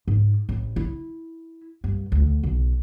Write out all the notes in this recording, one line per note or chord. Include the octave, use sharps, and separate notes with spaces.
G#2
A1
E4
G2
D2
B1